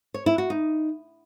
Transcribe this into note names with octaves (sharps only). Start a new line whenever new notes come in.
C#5
E4
F#4
D#4